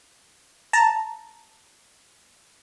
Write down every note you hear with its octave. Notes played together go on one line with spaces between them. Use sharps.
A5 A#5